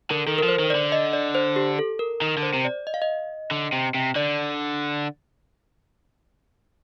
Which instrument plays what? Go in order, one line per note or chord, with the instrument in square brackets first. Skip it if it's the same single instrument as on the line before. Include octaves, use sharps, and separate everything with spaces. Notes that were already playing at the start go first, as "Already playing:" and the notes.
[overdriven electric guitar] D3 [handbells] A#4
[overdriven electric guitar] D#3 [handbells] A4
[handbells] A#4
[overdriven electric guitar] F3
[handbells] C5
[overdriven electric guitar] D#3
[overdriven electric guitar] D3 [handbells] D5
[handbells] D#5
D5
C5
G4
A4
A#4
[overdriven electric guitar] D#3 [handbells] A#4
[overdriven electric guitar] D3
[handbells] C5
[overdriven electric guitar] C3
[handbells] D5
D#5
F5
D#5
[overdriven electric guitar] D3
C3
C3
[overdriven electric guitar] D3 [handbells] D5